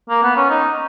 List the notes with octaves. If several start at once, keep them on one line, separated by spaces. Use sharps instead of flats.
A#3
B3
C#4
D#4